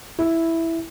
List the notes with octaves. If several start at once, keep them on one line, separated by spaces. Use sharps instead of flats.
E4